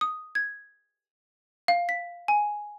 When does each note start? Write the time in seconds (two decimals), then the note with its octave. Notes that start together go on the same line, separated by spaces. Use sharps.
0.01 D#6
0.35 G#6
1.68 F5
1.89 B6
2.28 G#5